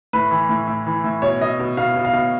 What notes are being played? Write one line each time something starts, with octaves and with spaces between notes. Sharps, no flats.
A2 B4
E3
A2
A2
E3
A2
B2 C#5
B2 D#5
B2
B2 F5
B2
F5
B2